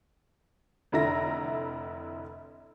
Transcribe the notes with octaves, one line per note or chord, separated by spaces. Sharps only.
F1 D3 E4 A#5 A#6